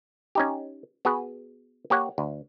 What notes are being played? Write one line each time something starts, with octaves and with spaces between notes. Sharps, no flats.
C#4 D#4 G4
B3 F#4 G#4 B4
A#3 G4 C#5 F#5
D2